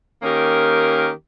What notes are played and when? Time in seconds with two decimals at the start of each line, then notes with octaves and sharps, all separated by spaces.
0.22 D#3 A#3 C#4 G4 A#4